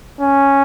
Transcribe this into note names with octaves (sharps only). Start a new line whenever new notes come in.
C#4